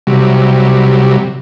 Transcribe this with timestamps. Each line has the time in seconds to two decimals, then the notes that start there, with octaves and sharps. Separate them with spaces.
0.07 C3 F#3 G3